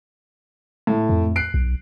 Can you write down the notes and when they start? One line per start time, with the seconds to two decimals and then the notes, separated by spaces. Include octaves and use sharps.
0.87 A2
1.09 F2
1.36 F#6 C7 D7
1.54 B1